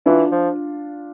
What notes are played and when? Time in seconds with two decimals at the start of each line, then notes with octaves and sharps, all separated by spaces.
0.06 E3 D4 F4
0.32 F3